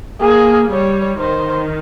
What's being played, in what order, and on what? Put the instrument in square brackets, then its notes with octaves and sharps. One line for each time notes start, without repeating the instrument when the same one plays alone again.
[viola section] A#3 [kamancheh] G#4
[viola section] G3 [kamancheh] C#5
[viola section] D#3 [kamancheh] C5